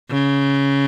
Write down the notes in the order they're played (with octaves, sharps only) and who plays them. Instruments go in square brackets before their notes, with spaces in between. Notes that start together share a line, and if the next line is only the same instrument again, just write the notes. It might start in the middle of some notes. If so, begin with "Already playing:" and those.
[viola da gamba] C#3